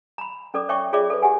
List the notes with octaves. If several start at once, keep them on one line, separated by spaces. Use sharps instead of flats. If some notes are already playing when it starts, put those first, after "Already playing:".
A#5 B5
C#4 A4 D5 D6
C#5 E5 G5 C#6 D6
F4 G#4 C#5 D5 E5 D6
A4 B4
G4 E5 F#5 G#5